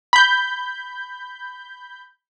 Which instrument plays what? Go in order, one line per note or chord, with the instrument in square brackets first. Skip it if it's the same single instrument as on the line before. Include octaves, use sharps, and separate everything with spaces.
[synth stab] B5 G6